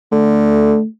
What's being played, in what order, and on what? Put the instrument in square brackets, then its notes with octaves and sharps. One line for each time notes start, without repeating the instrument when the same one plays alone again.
[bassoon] D3 [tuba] A3